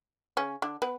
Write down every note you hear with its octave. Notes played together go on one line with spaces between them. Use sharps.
C#3 C#4
D3 D4
B3 B4